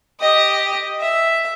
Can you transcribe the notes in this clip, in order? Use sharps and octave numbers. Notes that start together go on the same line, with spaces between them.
G4 D#5
E5